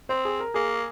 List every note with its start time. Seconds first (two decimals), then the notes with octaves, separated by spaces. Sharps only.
0.09 C4 C5
0.25 G#4
0.40 A#4
0.54 A#3 G#4